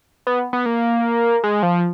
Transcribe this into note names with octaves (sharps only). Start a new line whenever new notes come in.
B3
B3
A#3
G#3
F3